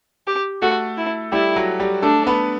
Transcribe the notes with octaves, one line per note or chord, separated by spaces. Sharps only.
G4
A3 F#4 A4
E4
G3 E4 G4
F#3 F#4
G3 G4
A3 D4 A4
B3 B4